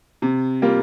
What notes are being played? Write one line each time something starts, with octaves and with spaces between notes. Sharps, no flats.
C3
G3 A#3 F4